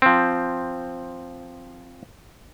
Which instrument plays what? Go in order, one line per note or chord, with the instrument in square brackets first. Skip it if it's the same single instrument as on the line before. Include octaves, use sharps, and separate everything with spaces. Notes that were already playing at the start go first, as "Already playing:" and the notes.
[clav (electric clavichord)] F3 C4